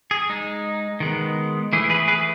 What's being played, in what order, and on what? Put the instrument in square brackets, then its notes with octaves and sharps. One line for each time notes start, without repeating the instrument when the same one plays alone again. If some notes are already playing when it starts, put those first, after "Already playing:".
[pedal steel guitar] G#4
G#3 D#4
D#3 G#3 B3
E3 A3 E4 G#4
G#4 B4
G#4 B4